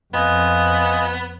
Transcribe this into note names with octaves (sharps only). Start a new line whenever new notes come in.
F2 B3 F4 D#5 G#5